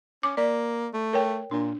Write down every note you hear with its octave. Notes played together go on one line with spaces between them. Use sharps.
C#4 D6
A#3 D5
A3
A#4 C#5 G5
A#2 D4